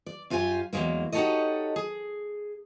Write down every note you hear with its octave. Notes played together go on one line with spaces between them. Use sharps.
D5
F#2 F4 G4 A#4 G#5
E2 G#2 F#3 G#3 A#3
D#4 F#4 G4 A4 C#5 D#5
G#4